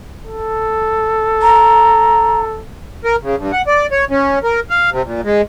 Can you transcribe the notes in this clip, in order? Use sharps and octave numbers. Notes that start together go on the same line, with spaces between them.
A4
A#5
A#4
C#3
G2
F#5
D5
C#5
C#4
A#4
F5
C3
A#2
G#3